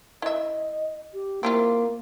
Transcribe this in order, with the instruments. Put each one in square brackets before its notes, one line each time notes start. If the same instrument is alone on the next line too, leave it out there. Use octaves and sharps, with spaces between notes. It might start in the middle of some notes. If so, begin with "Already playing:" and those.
[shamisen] E4 E5 [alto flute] D#5
[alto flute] G4
[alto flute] A#3 [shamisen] C4 E4 F4